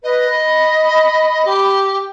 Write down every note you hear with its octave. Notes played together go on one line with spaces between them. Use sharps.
B4 D#5
B5
G4